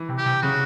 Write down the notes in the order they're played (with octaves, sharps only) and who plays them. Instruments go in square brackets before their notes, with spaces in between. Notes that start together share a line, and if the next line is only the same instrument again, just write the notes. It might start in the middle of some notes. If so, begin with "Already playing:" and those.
Already playing: [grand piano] E3
C3
[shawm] G4
[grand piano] C3
[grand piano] C#3 [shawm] F#4